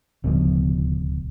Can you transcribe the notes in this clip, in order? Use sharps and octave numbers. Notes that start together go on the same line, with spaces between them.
D1 C#2 B2 F3